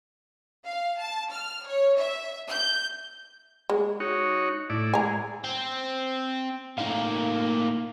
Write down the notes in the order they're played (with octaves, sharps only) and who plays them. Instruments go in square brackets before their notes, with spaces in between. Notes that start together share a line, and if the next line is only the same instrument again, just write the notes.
[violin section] F5
A5
F6
C#5
E5
G6
[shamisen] G#3
[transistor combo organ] D#4 F#4 C#5
A2 E4 D5
[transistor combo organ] G#3 [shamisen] G#5 A#5
[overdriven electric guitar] C4
[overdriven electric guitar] A2 A#3 [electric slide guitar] D#4 F5